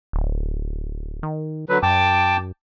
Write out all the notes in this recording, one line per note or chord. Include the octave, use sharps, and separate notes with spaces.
D1
D#3
D3 F#3 B4
F#2 G5 A5 D6